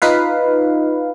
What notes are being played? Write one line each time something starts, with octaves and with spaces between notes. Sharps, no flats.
D#4 F4 B4 F5